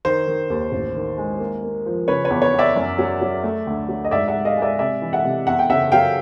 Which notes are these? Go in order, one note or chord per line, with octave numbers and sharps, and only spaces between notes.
D#3 C5
D#3
D#2
A1
D#3
G#3
A#3
A#3
F3
C#3 B4 C#5
B4 C#5
E2
B4 C#5
E2
D5 E5
F#2
F#3
F#3
A3
D2
F#3
D#5
G#2 D5 E5
E5 F#5
G#2
D#5 F5
G#3
D5 E5
C3 D5 E5
E3
E5 F#5
C3
E2 E5 F#5
G5
C#3 E5 F#5
F#3 F5 G5